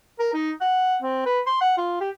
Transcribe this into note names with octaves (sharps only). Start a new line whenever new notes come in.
A#4
D#4
F#5
C4
B4
C6
F#5
F4
G4